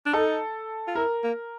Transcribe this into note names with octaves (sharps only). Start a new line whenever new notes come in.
D4
D#4 A4
F4
E4 A#4
A#3